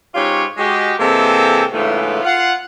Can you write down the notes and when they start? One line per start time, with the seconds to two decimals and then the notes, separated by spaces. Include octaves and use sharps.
0.15 G#2 C#4 F4 G4 C#5
0.57 G#3 F#4 G4
0.98 C3 E3 G#3 A#3 C4 A4
1.73 G#2 C#3 E3 A3 B3 F4
2.23 F4 F5 F#5